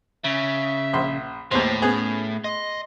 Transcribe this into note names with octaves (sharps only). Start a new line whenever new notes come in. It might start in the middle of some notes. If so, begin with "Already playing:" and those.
C#3 E5
A#1 C6
D#2 A2 B3 C5 C6
B3 C#4 G#4
D#5 C6